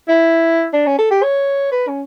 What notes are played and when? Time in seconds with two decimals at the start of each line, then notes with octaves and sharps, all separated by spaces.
0.08 E4
0.74 D4
0.87 C#4
0.99 A4
1.11 G4
1.23 C#5
1.72 B4
1.88 C#4